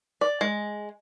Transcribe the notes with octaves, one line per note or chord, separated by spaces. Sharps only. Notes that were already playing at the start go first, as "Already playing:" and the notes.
D5
G#3